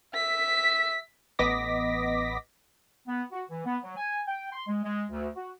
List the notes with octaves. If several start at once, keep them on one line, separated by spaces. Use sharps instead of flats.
E5 B6
A1 B3 D#5 D6 A#6 B6
B3
F#4
E3
B3
F#3
G#5
G5
C6
G#3
G#3
D2
F#4